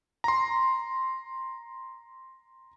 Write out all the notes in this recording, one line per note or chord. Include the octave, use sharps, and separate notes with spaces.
A#5 C6